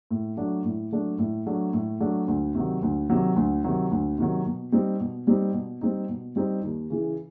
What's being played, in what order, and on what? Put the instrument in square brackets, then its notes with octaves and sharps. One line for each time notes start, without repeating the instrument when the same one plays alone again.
[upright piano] A2
F#3 A3 D4
A2
F#3 A3 D4
A2
F#3 A3 D4
A2
F#3 A3 D4
D2
C3 D#3 F#3
D2
C3 D#3 F#3
D2
C3 D#3 F#3
D2
C3 D#3 F#3
B2
G3 C4 D#4
B2
G3 C4 D#4
B2
G3 C4 D#4
B2
G3 C4 D#4
D#2
C#3 E3